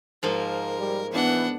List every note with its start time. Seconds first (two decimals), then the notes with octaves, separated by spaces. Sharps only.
0.23 G#2 F3 A#3 A#4
0.79 G3
1.13 E3 B3 D4 F#5